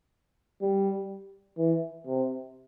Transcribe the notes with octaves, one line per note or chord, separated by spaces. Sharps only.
G3
E3
C3